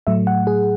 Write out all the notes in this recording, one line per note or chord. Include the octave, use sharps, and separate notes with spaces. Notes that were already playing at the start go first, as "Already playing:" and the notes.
A2 F#3 A3 E5
F#5
G#4